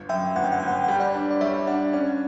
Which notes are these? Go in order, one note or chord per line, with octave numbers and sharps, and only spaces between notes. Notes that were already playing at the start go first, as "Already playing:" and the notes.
Already playing: G1
F#2 E5 G5
G1 F#5
G5
F#5
G1 G5
F#5
G5
F#5
G3 G5
D5 F#5
D4
D5
G3 C#5 E5
D4 D5 F#5
C#4 D5 F#5